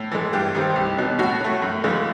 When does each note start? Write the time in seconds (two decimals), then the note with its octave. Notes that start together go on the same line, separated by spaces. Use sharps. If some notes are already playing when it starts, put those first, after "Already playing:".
Already playing: A2
0.11 E3 G#3
0.33 G2 G4
0.55 D#3 G3 C4
0.76 C2
0.97 B2 F#3
1.19 A2 F#4
1.41 F#3 A3
1.62 F#2
1.84 C#3 E3 G#3